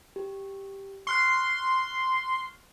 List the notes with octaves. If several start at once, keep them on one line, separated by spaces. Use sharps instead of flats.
G4
C6 C#6 F6 F#6